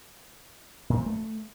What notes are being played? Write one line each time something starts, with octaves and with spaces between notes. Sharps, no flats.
A#2
F3
A3